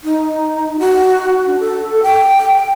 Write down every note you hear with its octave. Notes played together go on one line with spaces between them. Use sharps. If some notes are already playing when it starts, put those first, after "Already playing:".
D#4
F#4
D4
A4
G5